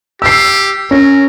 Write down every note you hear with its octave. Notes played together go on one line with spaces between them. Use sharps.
G4 E6 C7
C#4 A#4